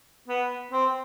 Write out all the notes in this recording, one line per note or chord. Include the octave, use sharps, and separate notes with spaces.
B3
C4